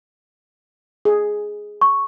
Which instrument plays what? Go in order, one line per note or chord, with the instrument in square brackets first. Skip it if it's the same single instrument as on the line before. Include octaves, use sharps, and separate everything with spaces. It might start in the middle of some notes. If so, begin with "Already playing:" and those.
[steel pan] G#4
[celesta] C#6